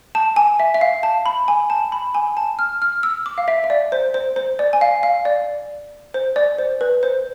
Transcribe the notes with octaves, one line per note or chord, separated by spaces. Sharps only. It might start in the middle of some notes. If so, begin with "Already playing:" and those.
A5
G#5
E5
E5
F5
A5
B5
G#5
A5
B5
G#5
A5
F6
F6
E6
D6
F5
E5
E5
D5
C5
C5
C5
D5
G#5
F5
F5
D5
C5
D5
C5
B4
C5